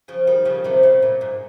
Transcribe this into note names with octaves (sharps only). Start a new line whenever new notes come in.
C#3 F3
D#3 G3
C#3 F3
C3 D#3
C#3
A#2
G#2